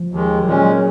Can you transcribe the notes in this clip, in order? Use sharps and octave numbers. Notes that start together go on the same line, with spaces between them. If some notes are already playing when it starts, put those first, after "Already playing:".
Already playing: F3
D#2 D#3 G#3
A#2 F#3 G#3 C#4